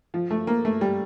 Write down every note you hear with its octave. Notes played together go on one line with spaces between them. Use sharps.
F3
A3
A#3
A3
G3